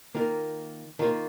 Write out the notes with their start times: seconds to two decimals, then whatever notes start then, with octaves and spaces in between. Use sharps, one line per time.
0.15 D#3 A#3 F4 A#4
0.99 D#3 A#3 F4 A#4